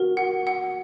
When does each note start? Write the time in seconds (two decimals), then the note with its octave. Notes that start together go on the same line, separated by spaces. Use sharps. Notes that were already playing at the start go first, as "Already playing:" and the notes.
Already playing: F#4 A#4
0.17 F#5
0.47 F#5